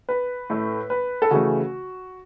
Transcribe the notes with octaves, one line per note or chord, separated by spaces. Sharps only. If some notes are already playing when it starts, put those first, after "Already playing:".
B4
A2 A3
B4
A4
C#3 E3 A3 F#4